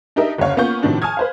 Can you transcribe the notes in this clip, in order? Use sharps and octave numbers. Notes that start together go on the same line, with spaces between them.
D4 D#4 G4 A#4 D#5 E5
F#1 D2 C#3 C#5 F5
A#3 B3 C#4 F4 C#6 G6
A2 C3 D#3 F3 D4 F#4
G#5 A5 C#6 D#6 F6 G#6
B4 C5 F5